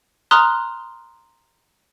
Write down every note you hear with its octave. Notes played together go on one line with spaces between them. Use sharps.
A#5 C6 D#6 F6 F#6